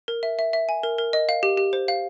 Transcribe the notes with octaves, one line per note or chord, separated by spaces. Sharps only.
A#4
E5
E5
E5
G#5
A#4
A#4
D#5
F5
G4
G4
C5
F5